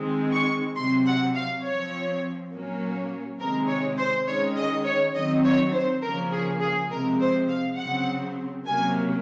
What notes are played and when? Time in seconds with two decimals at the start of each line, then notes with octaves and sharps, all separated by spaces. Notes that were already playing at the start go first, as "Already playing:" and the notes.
Already playing: D#3 G#3 C4
0.32 C#6
0.76 C3 F#3 C4 C6
1.05 F#5
1.34 F5
1.63 F3 C4 C#5
2.51 A#2 F#3 A#3 C#4
3.38 C3 D#3 G#3 C4 A#4
3.68 C#5
3.97 C5
4.26 D#3 G#3 C#4 C#5
4.56 D#5
4.84 C#5
5.14 D#3 F#3 C4 D#5
5.43 C#5
5.72 C5
6.02 C#3 F3 A#3 C#4 A#4
6.31 G#4
6.60 G#4
6.90 C3 F3 G#3 C4 A#4
7.19 C5
7.48 F5
7.77 C#3 F#3 C4 F#5
8.65 C3 F#3 A#3 C#4 G#5